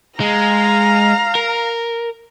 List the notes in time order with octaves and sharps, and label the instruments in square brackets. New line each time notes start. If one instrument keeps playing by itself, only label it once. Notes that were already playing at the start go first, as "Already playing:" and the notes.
[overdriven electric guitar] G#3 [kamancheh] F5 A#5
[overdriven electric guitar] A#4